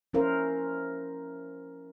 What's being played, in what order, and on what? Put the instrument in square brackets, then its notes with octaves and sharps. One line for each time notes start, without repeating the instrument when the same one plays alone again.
[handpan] F3 C#4 E4 A#4 C5 F5